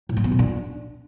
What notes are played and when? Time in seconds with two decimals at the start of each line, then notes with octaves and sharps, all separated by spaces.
0.09 A2
0.17 F3
0.24 B3
0.32 A#2
0.39 D4